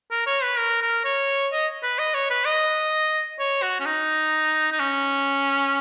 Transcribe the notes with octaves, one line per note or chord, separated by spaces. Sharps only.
A#4
C#5
B4
A#4
A#4
C#5
D#5
B4
D#5
C#5
B4
D#5
C#5
F#4
C#4
D#4
D#4
C#4